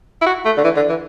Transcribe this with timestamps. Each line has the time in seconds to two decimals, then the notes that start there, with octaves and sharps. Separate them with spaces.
0.22 E4
0.26 F#4
0.45 A3
0.57 D3
0.64 E3
0.76 D3
0.89 E3